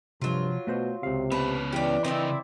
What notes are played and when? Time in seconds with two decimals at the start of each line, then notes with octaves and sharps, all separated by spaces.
0.22 G2 C3 F3 F#3 F4
0.67 B2 A3 F#4 C5
1.03 C#2 C3 F5
1.32 B3 C#4 B4 A5
1.72 E3 D4 G4
2.04 C#3 C4 E4 A#4 D5 D#5